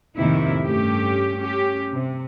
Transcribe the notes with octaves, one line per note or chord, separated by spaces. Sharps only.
F2 A2 C3 D#3 A#3 E4
G2 A3 C#4 G4
C#4 G4
C3